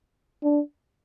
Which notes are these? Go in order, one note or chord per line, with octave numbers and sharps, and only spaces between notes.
D4